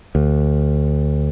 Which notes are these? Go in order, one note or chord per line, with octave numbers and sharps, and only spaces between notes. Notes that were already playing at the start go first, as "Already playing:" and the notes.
D2